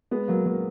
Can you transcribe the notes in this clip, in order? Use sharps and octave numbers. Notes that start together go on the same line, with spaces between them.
G#3 B3
F#3 A#3
F#3 A#3